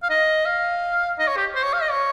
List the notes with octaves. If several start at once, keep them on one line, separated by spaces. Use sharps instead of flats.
F5
D#5
F5
D#5
C#5
G4
C5
C#5
F5
D#5
C#5